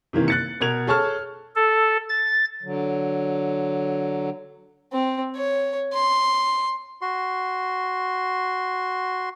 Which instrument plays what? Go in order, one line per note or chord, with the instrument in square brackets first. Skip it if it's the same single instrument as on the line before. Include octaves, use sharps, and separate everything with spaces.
[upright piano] C3 D#3 E3 A#3
F#6 A6 C#7
B2 A#4 G#6 F7
G#4 A4 C#5 A5 C#6 F6
[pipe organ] A4
A6
[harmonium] D3 F#3
[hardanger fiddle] C4
C#5
C6
[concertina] F#4 C6